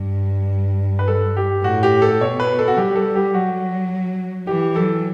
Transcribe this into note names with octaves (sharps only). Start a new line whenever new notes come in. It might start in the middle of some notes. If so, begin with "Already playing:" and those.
Already playing: G2
B4
A4
G4
A2 F#4
G4
A4
B2 C#5
B4
A4
F#4
G3 G4
A4
G4
F#3 F#4
E3 G4
F#3 A4